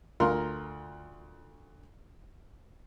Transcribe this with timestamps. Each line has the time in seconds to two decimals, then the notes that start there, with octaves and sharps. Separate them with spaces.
0.20 D2 F4 A#4 A#5 C6